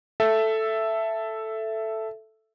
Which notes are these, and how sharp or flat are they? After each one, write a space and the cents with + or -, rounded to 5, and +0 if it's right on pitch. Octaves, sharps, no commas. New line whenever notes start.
A4 +0 E5 +10